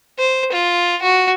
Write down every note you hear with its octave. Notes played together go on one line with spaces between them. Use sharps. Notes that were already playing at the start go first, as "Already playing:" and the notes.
C5
F4
F#4